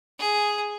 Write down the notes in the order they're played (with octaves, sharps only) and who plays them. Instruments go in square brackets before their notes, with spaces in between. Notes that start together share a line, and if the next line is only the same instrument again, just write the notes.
[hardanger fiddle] G#4